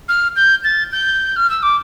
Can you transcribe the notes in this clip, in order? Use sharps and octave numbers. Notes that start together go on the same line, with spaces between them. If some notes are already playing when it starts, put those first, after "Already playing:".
F6
G6
A6
G6
F6
E6
D6